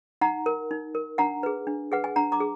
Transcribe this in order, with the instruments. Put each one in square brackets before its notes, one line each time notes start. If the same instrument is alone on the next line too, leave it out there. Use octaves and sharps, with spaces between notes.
[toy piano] D#4 F#5 A#5
A#4
D#4
A#4
D4 F#5 A#5
G#4 B4
D4
G#4 B4 F#5
G#5
D4 F#5 A#5
A#5 D6
G#4